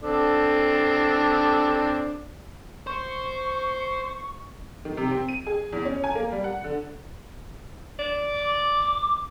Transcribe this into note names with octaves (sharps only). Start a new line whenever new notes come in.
C4 D4 A4
C5 C#6
D#3
C3
C4
D#7
G#4
E2
C#4
G#5
A#3
G3
F#5
D3
D5
D6